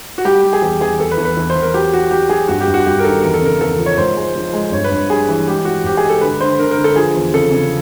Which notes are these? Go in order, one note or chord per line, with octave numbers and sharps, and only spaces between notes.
F#4
G3 G4
G3
G#4
E2 G4
E2 G#4
E2 A4
B4
E2
B4
E2
C5
E2
A#4
F#3 G4
F#3 F#4
F#3 G4
F#3 G#4
G2 F#4
G4
G2
F#4
G2 G4
A#4
D#3 A4
E2 A#4
A4
C#3 A#4
E2 A4
F3
C#5
G#2 C5
G#3
F3
G#3
G2 C#5
B4
G2
G3 G#4
E3
G#3 G4
E3 F#4
G#2 G4
G#4
G#3
A4
D3 B4
D3 C5
D3 A#4
A#4
D3
A4
F3 G#4
E2
C#3 A4
C#3